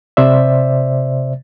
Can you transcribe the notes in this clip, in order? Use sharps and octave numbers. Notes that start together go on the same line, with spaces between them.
C3 C5 D5 E5